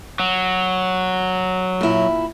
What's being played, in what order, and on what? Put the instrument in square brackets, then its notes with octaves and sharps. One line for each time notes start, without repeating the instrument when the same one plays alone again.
[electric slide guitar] F#3
[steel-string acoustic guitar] A#2 E4